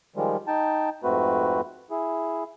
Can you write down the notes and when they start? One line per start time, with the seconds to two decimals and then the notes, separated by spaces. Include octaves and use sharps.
0.16 D#3 F3 G3 G#3
0.48 D#4 G5 A5
1.04 F2 G#2 A3 C4 F#4 B4
1.91 E4 G#4